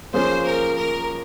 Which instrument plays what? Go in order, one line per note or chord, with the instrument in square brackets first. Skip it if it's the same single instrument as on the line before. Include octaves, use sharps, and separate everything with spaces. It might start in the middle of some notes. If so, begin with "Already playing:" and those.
[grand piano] F3 A#3 C#4 G#4 [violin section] C5
[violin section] A#4
A#4